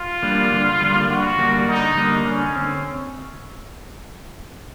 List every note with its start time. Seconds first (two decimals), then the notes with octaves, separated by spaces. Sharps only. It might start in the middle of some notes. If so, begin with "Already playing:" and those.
Already playing: F4
0.23 G3 A#3 D4
0.51 D3
0.81 G3 A#3 D4
1.09 D3 F#4
1.39 G3 A#3 D4
1.67 D3 D#4
1.97 G3 A#3 D4
2.25 D3 C#4
2.55 C4